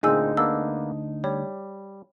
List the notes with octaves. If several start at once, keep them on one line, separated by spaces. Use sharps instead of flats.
D2 A#2 D3 C4 D#4 G#4 G#5 E6
A#3 B3 D4 E6
G3 C#5